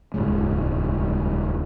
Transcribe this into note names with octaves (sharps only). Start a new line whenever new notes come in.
D#1 C#2 G#2 G#3